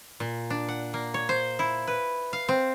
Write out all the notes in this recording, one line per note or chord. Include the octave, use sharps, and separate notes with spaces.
A#2
D4
F#5
A#3
C#5
C5
E4
B4
F5
C4